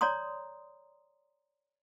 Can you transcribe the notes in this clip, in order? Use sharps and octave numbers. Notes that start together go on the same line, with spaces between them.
C#5 D5 A#5 C6 D#6